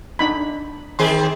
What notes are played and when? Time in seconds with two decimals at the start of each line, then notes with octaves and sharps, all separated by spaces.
0.19 D4 D#4 B5
0.99 D#3 C4 G#4 C6